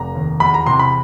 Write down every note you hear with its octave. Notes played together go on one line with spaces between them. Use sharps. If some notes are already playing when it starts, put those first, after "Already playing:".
Already playing: F1 A#5
D#2
E2 B5
A#5
C3 C6
B5